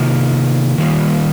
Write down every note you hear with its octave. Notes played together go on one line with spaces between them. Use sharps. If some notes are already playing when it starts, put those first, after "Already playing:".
Already playing: C3 D#3 A#3 F4
D#3 G3 A#3 F4